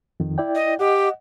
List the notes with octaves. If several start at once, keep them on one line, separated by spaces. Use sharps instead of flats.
F2 D#3
E4 D5 G5
D#5
G4 D#5 F#5